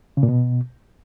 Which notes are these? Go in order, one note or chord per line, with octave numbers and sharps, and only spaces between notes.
C#3
A#2
B2